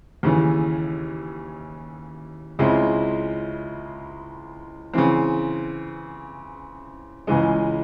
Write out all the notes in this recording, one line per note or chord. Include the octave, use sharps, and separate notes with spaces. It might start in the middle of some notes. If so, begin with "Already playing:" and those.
D#2 C#3 E3
C#2 C#3 G#3 C4 E4
C#3 E3 C4
C#2 C#3 E3 G#3